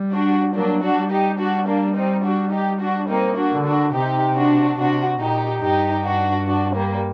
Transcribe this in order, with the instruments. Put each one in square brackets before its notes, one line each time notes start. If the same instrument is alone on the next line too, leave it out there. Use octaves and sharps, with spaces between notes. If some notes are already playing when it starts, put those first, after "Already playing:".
Already playing: [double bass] G3
[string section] D4 F#4
[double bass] F#3 [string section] A#3 D4
[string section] D4 F#4
[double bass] G3
[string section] D#4 G4
D4 F#4
A#3 D4
C4 D#4
D4 F#4
D#4 G4
D4 F#4
[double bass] A#3 [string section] C4 D#4
[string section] D4 F#4
[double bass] D3
[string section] D4 F#4
[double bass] C3 [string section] D#4 G4
[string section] D4 F#4
[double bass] C3 [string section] D4 F#4
[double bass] A#2 [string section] D#4 G4
[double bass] G2 [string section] D#4 G4
[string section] D4 F#4
D4 F#4
G3 A#3